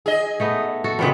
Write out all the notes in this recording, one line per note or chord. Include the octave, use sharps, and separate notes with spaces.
G#4 D#5
A3 B3 D#4
F#4 A4
E2 C#3 B3 C4